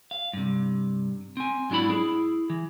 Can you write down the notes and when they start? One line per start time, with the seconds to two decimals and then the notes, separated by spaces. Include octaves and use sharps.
0.11 F5
0.33 G2 C3
1.37 C4 G#5
1.70 G#2 F#3 D4 E4 B5
1.89 E4 G#4
2.50 E3